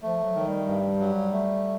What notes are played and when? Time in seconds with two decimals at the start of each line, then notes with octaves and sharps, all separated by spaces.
0.02 F3 A3
0.24 F#3
0.35 D#3 F#3
0.46 G3
0.68 G2
1.00 F#3
1.32 A3